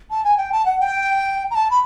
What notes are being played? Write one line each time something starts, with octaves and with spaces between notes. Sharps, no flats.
A5
G#5
G5
A5
F#5
G5
A#5
A5
B5